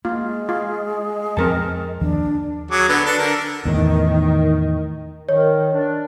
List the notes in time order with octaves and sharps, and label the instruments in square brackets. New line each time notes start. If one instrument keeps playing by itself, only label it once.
[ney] G#3 [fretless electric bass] A#3 [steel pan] F4
[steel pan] F4
[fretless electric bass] F2 F3 [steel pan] C4 A#4 A5
[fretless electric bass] D#2 D#3 F3 [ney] D4
[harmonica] F#3 G#4 D6
D3 B3
D4 A4
D3 A#4
[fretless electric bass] E2 A2 [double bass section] D#3
[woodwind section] D#3 [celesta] C#5
[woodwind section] D4